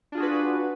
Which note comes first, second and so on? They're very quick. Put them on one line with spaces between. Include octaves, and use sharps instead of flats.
D4 F4 G#4 F#4 B4